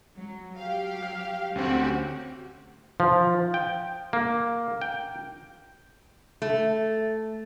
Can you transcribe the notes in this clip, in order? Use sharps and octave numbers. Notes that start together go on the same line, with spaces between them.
F#3
F#3 G4 F5
F6
D2 C4 C#4 F#4 G4
F3
G5
A#3
G5
A3